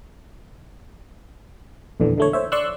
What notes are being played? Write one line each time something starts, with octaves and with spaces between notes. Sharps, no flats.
A#1 E2 D3 E3
D3 A3 C#5
C5 C#5 E5
D5 C6 C#6 E6 F#6